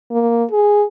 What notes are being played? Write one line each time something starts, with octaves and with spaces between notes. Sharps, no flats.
A#3
G#4